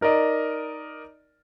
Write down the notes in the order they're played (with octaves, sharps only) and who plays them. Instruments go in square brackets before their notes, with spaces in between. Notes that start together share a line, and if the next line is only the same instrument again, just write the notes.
[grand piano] D#4 A#4 D5 D#5